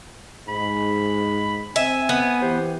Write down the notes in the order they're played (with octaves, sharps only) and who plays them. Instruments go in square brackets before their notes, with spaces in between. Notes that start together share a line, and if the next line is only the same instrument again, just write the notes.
[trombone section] G#2 [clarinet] B5
[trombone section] C4 [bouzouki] E5 [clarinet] G#5
[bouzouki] B3
[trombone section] E3 G4 [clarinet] C5